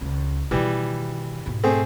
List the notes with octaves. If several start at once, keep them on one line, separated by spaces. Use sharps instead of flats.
C#2
B2 D#3 E3 G3
G#2 B2
A3 C4 G#4